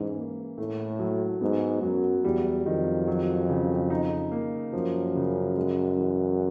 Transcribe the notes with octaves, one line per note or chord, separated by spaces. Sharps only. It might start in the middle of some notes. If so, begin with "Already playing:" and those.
Already playing: G#2 E3 C#4
A#3
A2 A3
F#3
G#2 B3
F#2 F#3
E2 G3
F2 D#3
F#3
C#3
D#4
A#3
F#2 F3
C#3
G#3
E3